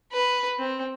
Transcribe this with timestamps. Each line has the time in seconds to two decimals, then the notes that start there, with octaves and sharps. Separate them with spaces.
0.12 B4
0.59 C4